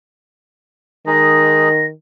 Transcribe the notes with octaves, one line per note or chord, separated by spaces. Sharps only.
D#3 G#3 D#4 G#4 A#6